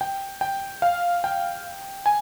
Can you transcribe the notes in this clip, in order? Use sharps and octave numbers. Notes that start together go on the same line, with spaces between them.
G5
G5
F5
G5
G#5